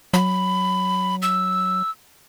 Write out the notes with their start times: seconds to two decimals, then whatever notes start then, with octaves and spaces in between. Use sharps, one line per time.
0.13 F#3 B5
1.22 E6